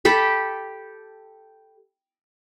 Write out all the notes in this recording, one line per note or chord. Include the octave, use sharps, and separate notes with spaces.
G4 A4 B5